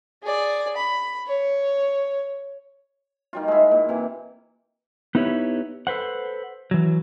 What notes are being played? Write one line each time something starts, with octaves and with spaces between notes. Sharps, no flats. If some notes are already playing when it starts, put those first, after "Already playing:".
G#4 D5
B5
C#5
D#3 G3 F4
G#3 E4
A#2
C3 E3
B3 D#4 E4 G4 B4 C#5
A4 B4 C5 F#5
E3 F#3